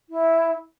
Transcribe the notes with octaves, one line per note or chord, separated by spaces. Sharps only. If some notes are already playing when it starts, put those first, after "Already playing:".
E4